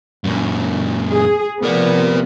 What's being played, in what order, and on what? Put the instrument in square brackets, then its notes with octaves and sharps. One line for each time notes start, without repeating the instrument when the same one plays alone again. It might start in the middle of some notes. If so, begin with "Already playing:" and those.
[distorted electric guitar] F#2 A#2
[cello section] G#4
[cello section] C3 F3 B3 [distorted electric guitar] A#4 D5